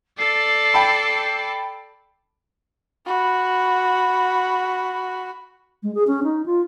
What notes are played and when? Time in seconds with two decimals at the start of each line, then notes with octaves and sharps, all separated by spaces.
0.18 A4 D5 C7
0.74 G5 A5 B5
3.07 F#4 B5
5.83 G#3
5.95 G#4
6.07 C#4
6.23 D#4
6.46 F4